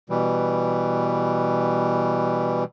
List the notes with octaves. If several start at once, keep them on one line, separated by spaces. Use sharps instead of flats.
B2 E3 G3